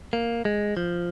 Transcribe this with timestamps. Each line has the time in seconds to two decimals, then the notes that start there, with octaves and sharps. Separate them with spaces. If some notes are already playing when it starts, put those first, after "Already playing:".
0.13 A#3
0.45 G#3
0.77 F3